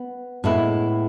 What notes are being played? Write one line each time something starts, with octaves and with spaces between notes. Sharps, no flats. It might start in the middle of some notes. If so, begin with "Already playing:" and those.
Already playing: B3
A2 G#3 B3 E4